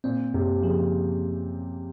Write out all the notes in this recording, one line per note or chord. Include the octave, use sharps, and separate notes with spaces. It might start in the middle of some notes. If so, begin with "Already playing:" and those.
A#2 C4
F#2 C3
C#3 F3